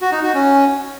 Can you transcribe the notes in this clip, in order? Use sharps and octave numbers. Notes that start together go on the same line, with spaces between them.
F#4
D#4
F#4
C#4